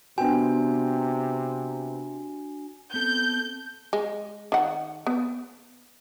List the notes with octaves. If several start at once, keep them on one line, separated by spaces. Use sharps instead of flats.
C3 B3 D4 F#4 G5 G#5
B3 C4 A4 G6
G#3
D#3 F#5
B3